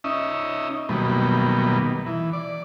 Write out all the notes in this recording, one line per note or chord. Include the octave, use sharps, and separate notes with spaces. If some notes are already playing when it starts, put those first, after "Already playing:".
C#4 D#4 D#5 E5
B2 D#3 F#3 G3 A#3 B3
E3
D5